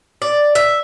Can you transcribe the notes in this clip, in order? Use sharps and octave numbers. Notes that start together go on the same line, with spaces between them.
D5
E5